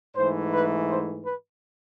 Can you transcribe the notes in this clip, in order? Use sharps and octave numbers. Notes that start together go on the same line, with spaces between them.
G#2 E3 A3 C5
B4
C5
B4